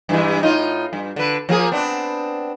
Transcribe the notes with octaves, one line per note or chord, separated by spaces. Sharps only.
G2 E3 G#3
A2 D#4 F4
G2
D3 B4
F3 A#3 G#4
B3 C4 D4